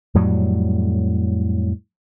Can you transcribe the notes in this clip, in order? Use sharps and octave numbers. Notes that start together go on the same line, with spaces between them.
F2 A2 F#3 G3